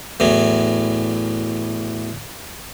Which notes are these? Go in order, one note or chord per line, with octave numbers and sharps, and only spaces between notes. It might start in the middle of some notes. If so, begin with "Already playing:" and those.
E2 A2 F#3